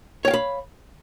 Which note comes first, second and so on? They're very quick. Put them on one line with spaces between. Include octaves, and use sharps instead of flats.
C#5 G5 F5 B5